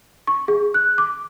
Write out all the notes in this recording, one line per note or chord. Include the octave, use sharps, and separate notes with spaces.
C#6
G#4
F#6
D6